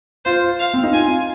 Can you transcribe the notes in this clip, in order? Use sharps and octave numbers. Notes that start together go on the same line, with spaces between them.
F4 C5
F5
C4
D#4
F4 G#5